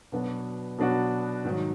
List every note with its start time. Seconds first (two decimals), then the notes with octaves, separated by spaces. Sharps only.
0.12 B2 F#3 B3 D4 F#4
0.78 B2 F#3 B3 D4 F#4
1.44 G#2 D#3 F#3